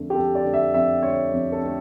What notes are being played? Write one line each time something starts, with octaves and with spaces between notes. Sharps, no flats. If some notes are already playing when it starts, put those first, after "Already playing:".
Already playing: F2 D3 A3
G4
F2 A4
D5
D3 A3
E5
F2 E5
D3 A3 C#5
F2
A4
D3 A3